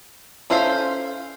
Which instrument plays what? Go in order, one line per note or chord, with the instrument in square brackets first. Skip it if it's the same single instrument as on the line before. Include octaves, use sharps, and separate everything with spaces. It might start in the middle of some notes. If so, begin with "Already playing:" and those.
[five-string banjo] C#4 A4 C5 E5 F5